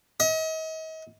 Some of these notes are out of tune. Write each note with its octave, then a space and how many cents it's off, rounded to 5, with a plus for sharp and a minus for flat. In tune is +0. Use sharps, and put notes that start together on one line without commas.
D#5 +40